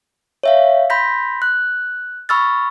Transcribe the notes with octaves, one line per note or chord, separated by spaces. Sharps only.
C#5 E5 F5
B5 C6 G6 A#6 B6
F#6
B5 C#6 E6 F6 A6